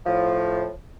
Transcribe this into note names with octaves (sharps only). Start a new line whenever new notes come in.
A2 F3